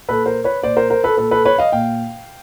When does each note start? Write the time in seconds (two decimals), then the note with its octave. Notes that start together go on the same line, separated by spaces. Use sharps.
0.08 A#2 A4 B4
0.26 A#4 C5
0.44 B4 C#5
0.62 A#2 C5 D5
0.76 A#4 C5
0.90 A#4 C5
1.04 A4 B4
1.17 A#2 A4 B4
1.31 A4 B4
1.45 B4 C#5
1.58 D#5 F5
1.72 A#2 F5 G5